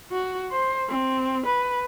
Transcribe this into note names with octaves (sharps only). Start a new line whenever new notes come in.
F#4
C5
C4
B4